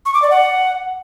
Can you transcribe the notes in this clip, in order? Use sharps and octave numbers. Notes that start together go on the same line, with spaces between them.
C#6
D6
D5
F#5